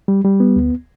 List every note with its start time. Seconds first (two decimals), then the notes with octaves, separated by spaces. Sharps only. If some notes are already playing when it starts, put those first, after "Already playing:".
0.08 G3
0.24 G3
0.40 B3
0.56 D2